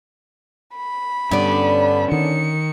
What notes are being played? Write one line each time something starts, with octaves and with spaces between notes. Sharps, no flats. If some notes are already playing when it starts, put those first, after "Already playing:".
B5
G2 D3 B3 C#4 D4
D#3 C#7